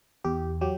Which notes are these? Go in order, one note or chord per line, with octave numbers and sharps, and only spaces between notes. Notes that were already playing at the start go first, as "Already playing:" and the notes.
E2 G4
F#3 G4